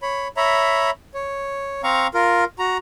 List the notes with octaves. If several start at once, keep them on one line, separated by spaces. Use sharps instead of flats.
C#5 B5
C#5 E5 A#5 B5
C#5
C4 F5 A#5 C#6
F4 A#4
F#4 A#5